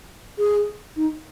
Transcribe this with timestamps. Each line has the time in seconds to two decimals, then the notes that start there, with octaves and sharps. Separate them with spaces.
0.38 G#4
0.96 D#4